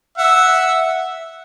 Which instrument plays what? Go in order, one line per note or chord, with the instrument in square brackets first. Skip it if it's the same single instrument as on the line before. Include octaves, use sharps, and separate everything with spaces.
[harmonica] E5 F#5